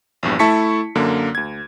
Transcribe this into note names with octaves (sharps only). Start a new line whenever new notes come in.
A#1 E2 G2
A3 E4 A5 C#6 B6 C#7
F#2 D3 A#3
D2 G#6